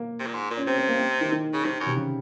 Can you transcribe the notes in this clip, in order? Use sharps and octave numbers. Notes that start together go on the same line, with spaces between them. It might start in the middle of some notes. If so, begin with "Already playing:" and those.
Already playing: A#3
C3
A#2
G#2
A#2
C#4
C3 C4
C4
A#3
C4
D#3
D#3
C#3
C3 D#3
F#2
C3
C#3